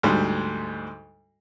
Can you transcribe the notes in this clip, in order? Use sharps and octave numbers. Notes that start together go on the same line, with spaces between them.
D2 G#2 G3